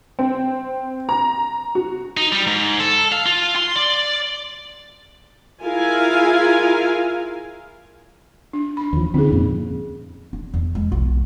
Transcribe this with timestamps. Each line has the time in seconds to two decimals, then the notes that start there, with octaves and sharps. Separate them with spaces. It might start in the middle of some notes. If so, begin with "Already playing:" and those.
0.19 C4
1.09 A#5
1.75 F#4
2.17 D#4
2.32 G3
2.47 G#2
2.80 A4
3.12 F5
3.26 F4
3.56 C6
3.76 D5
5.64 E4 F4 G#4 A#4 F5 G#5
8.53 D4
8.77 D4 B5
8.93 D#2 F3
9.14 D3 C4 C#4 D#4 G#4
9.32 F2 A#2
10.33 D4
10.54 E2
10.75 G#3
10.92 B1